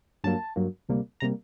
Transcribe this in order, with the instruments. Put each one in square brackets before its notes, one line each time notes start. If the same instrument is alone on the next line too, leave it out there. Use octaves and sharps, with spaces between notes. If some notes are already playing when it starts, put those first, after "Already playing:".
[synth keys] G2 F#3 A#3 A5
G2 F#3 A#3
D2 C3 G3 A#3
C3 G3 A#3 A#5